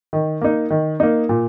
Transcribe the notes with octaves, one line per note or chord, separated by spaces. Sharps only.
D#3
A#3 D#4
D#3
A#3 D#4
A#2